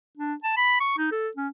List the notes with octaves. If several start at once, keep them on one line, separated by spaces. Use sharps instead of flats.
D4
A5
B5
C#6
D#4
A4
C#4